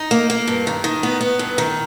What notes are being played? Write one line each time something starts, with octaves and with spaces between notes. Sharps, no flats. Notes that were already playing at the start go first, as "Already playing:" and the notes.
Already playing: D#4
A#3
A#3
G2
D#3
D#3
B3
B3
G2
D#3